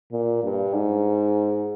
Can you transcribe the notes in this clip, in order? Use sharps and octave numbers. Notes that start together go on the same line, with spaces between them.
A#2
G2
G#2